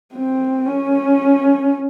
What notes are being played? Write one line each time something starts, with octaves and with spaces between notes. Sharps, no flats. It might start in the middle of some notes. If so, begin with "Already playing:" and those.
C4
C#4